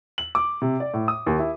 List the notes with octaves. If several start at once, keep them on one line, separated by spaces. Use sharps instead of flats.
F#7
D6
C3
D5
A2
D#6
D#2
E4